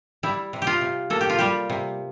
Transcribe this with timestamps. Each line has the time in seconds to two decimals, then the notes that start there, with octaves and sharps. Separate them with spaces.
0.23 G3 E4
0.53 C3
0.62 G4
0.67 F4
0.81 C3
1.10 A#3 A4
1.21 G4
1.30 F4
1.39 G3 G4
1.70 C3